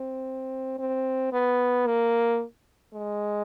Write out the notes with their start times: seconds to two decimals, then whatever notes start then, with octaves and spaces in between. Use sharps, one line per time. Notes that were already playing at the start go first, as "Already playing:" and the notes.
Already playing: C4
0.79 C4
1.32 B3
1.86 A#3
2.94 G#3